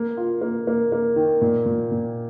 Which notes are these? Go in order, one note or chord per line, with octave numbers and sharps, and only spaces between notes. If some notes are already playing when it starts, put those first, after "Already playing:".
Already playing: A#3
F4
A#3
A#3
A#3
D#3
A#2
A#2
A#2